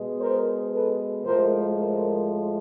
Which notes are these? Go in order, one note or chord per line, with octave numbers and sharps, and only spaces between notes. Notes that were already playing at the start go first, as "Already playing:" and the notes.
Already playing: B2 G#3
A#4 C5
A4 B4
A2 F3 G#3 A#4 C5
A#4 C5